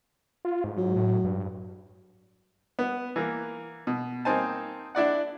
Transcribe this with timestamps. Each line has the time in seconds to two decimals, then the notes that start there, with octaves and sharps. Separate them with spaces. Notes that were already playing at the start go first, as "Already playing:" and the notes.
0.45 F4
0.64 G#2
0.77 F#3
0.96 A2
1.24 G2
2.79 B3
3.16 E3 A#3
3.87 B2
4.25 A#3 C4 D#4 C5 G#5 A5
4.95 D4 E4 D5 F#5